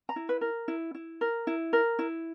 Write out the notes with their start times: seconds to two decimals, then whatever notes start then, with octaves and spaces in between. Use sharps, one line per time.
0.09 A#5
0.16 E4
0.29 B4
0.41 A#4
0.68 E4
0.94 E4
1.21 A#4
1.47 E4
1.73 A#4
1.99 E4